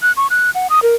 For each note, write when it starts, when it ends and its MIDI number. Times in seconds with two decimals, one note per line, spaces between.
0.02 0.12 90
0.17 0.27 85
0.30 0.51 90
0.55 0.68 78
0.70 0.80 87
0.83 0.95 70